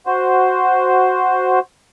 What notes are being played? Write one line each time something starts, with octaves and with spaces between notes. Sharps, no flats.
F#4 C5